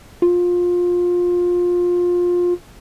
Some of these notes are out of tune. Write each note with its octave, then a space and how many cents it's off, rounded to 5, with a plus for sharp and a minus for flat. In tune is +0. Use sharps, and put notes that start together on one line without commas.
F4 +20